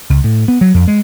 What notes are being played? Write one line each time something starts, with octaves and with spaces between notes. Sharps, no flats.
C#2
A2
B3
F#3
F2
G#3